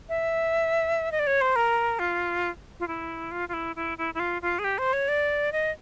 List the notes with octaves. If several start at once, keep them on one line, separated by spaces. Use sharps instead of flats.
E5
D#5
D5
C#5
C5
A#4
F4
F4
E4
F4
F4
E4
E4
E4
E4
F4
F4
G#4
G4
C5
C#5
D5
D#5